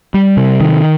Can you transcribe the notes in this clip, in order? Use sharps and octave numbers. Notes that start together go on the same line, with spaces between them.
G3
C3
D#3